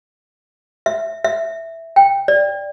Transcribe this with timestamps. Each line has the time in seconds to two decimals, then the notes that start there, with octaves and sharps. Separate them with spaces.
0.86 E5
1.24 E5
1.96 G5
2.28 D5